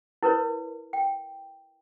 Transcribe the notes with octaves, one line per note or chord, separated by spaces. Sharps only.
E4 A#4 B4 C#5
G5